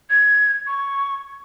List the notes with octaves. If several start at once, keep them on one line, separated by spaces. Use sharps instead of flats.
G#6
C#6